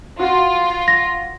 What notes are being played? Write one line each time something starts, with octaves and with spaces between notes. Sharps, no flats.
F4 F#4
A#6